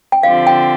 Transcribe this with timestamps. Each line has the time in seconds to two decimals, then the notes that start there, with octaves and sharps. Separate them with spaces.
0.12 G5
0.23 D3 F3 C4 G4 F5
0.47 G5